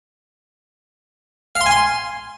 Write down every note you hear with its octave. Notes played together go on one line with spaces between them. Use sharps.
F5
C6
G#5
C6